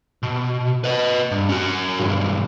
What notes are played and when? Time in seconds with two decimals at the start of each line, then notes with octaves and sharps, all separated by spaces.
0.23 B2
0.84 B4 D#5
1.31 G2
1.49 C#4 F#4
1.99 B1 G2